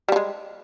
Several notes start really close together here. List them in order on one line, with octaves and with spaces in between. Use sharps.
G3 F3 G#3